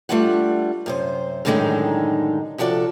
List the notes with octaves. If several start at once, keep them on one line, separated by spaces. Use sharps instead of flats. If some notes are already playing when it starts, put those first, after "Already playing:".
G3 A3 D4 F4 G4 F#5
F#2 C3 C5
F#2 A2 D3 D#3 G#3 D#4
C3 F3 F#4 A4 D5